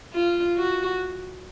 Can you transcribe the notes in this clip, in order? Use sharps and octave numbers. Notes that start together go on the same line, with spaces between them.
F4
F#4